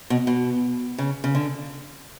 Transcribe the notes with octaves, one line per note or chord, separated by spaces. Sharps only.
B2
B2
C#3
C#3
D3